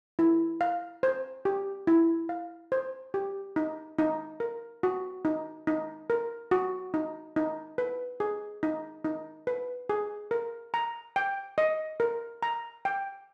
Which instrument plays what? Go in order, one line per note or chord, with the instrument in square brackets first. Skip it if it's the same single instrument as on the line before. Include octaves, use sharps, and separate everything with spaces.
[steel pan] E4
F5
C5
G4
E4
F5
C5
G4
D#4
D#4
A#4
F#4
D#4
D#4
A#4
F#4
D#4
D#4
B4
G#4
D#4
D#4
B4
G#4
A#4
A#5
G5
D#5
A#4
A#5
G5